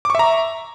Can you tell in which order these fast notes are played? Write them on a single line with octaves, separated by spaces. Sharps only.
D6 C#6 E5 A#5